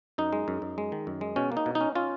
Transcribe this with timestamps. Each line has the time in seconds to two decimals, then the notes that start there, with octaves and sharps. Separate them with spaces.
0.18 F#2 D#4
0.33 G#3
0.48 F#2
0.62 F#2
0.78 G#3
0.92 D#3
1.07 F#2
1.21 G#3
1.36 B2 C#4
1.52 A#3
1.57 D#4
1.66 B2
1.75 D#4
1.81 C#4
1.95 C#4 F4